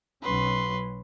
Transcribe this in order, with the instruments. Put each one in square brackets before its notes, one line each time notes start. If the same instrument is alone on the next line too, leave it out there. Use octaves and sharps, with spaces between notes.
[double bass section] B1 F#3 C#4 [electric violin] B4 C6